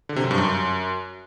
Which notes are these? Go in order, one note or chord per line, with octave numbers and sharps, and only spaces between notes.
D3
C3
F#2
G2
F#2